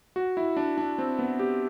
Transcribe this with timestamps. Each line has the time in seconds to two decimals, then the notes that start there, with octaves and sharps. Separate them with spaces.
0.16 F#4
0.37 E4
0.57 D4
0.78 D4
0.98 C4
1.19 B3
1.39 G4